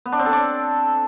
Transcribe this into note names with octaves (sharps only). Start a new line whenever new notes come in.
B3
D4
C4
A4
D5